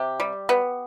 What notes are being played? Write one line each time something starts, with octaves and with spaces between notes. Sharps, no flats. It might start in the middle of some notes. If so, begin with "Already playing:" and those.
Already playing: C3 G4
G3
B3